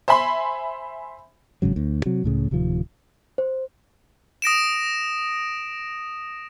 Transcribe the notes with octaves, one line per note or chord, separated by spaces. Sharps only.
C5 E5 G#5 B5 C6
G1 G#2 C#3 F#3
D2
C3 F#3
C#2 A2 C#3
D1 C3 D#3 F3
C5
D#6 A#6 D7 E7